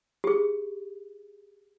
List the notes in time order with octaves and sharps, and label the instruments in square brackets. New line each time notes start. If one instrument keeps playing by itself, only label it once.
[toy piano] G4 G#4